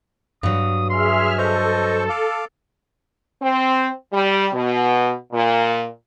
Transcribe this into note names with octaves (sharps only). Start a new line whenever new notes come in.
G2 F#3 D#6
G#4 E5 C6 F6
A4 C5 D#5 C#6
F5 D6
C4
G3
B2
A#2